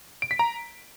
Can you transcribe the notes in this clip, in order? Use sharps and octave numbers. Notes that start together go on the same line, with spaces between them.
D7
B6
A#5